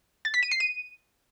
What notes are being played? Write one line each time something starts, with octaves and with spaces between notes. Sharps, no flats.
A6
B6
D#7
C7
D#7